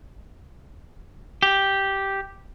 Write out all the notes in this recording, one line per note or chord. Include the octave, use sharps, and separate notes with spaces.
G4